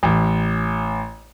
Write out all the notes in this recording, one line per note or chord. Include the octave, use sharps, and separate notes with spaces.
A1